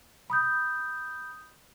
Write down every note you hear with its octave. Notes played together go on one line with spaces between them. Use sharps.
B5 D#6 G6